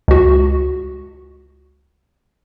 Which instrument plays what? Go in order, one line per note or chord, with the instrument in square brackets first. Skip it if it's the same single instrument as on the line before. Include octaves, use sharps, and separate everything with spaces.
[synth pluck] C#2 F#4